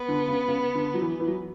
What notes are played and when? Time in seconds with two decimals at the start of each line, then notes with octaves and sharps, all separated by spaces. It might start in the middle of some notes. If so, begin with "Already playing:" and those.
Already playing: B3
0.08 D3
0.27 C#3
0.47 C#3
0.75 D3
0.94 F#3
1.01 E3
1.20 E3
1.27 F#3